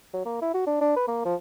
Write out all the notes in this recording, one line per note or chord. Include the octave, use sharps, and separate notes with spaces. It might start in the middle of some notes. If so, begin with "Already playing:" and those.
F#3
A#3
E4
F#4
D4
D4
B4
A#3
F3